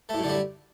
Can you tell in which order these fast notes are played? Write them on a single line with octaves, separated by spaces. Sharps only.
A3 A2 F#2 D3 G3